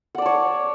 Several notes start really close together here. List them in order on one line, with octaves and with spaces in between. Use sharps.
F#5 D5 A5 C#5